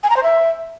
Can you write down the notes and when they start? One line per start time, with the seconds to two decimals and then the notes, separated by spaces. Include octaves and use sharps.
0.03 G#5
0.10 A#5
0.16 C5
0.23 E5